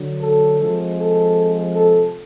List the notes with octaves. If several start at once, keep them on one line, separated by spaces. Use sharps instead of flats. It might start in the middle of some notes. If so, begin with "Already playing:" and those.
Already playing: D3 F#3
A4
C3 F3 G#3
A4
A4